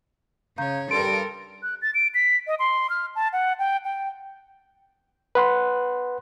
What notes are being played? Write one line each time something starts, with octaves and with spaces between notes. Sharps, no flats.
C#3 C#5 F5 A#5 G6
G2 A4 A#4 C6 D7
F#6
A6
D7
B6
D#5
C6
F6
A5
F#5
G5
G5
B4 F#5 C6 F#6